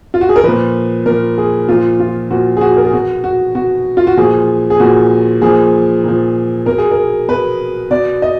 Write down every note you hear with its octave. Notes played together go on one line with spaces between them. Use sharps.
F4
F#4
G#4
A#4
A#2 F3 B4
A#2 F3 A#4
G#4
A#2 F3 F4
F4
A#2 F3 F#4
G#4
F#4
A#4
G#4
B2 F#4
F#4
B2 F#4
F4
F#4
A#2 F3 G#4
G#4
A#2 F3 F#4
A#2 F3 G#4
A#2 F3
B2 A#4
G#4
A#4
B2 B4
B2 D5
D#5